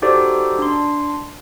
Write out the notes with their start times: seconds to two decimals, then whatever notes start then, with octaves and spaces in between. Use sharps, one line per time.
0.02 D#4 F#4 G4 A4 C5 D5
0.59 D4 C6